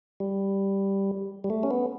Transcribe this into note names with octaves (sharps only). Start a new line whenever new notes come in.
G3
G3
A3
C#4
B3